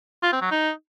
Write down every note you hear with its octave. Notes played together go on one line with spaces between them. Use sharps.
F4
C4
F#3
D#4